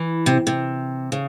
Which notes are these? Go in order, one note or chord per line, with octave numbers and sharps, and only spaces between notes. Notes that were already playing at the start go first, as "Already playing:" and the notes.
Already playing: E3
C3
C3
C#3